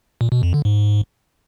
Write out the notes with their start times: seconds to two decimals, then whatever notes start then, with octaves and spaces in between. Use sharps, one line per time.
0.21 A#2
0.32 B2
0.43 F2
0.54 D3
0.65 G#2